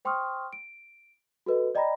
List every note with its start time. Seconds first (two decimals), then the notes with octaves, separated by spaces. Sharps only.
0.05 C5 G5 C6 C#6 D#6 F6
0.53 D7
1.46 F#4 A4 B4 D#5
1.75 D5 D#5 G5 A#5 B5 A#6